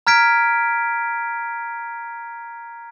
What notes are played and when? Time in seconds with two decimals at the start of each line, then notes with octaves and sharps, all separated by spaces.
0.07 A#5 F6 G#6 B6 D7